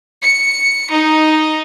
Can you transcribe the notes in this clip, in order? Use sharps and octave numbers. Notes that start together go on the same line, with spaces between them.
C#7
D#4